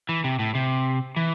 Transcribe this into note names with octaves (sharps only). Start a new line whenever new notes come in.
E3
C3
A2
C3
E3